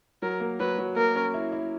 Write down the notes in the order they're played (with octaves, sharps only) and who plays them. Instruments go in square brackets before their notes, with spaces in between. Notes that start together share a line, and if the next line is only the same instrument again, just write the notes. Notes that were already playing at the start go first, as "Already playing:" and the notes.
[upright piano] F#3 [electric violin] A#4
[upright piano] A#3
[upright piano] F#3 [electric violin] B4
[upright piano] F#3
[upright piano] A#3 [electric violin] A#4
[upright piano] C#4
E4
E4